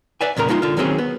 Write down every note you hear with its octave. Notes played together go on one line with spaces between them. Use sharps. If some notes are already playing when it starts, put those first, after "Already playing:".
B4 D5 E5 G#5
E2 A#2 C#3 A#4 A#5
G#3 D#4 F4 A5 C6
D3 F4
D#3 F#3 A#3 C4 C#4 G#4
B3